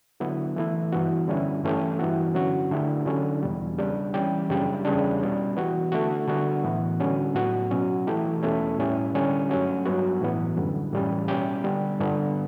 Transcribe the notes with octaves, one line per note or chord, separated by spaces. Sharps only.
D3 F#3 B3 E4
E3 A3 E4
G2 E3 B3 F#4
D3 G3 C#4 E4
G2 E3 A3 C#4 G4
G2 E3 B3 F#4
D3 F#3 C#4 F#4
D3 A3 E4 G4
D3 F#3 C#4
E2 B2 G3
C#3 G3 D4 G4
E3 G3 C#4 G4
F#2 C#3 G3 D4 G4
E2 C#3 G3 D4
B2 G3 C#4
E3 B3 F#4
D3 A3 D4 F#4
D3 G3 B3 F#4
A2 E3 B3
D3 G3 C#4 F#4
A2 F#3 B3 F#4
B2 F#3 C#4
E3 A3 E4 G4
E2 B2 A3 C#4
A2 G3 C#4 E4 G4
D3 G3 C#4
G2 F#3 A3 C#4 F#4
G2 F#3 B3 F#4
A2 E3 B3
F#2 D3 G3
A2 E3 G3 C#4 G4
B2 G3 C#4 G4
D3 G3 B3
G2 D3 G3 B3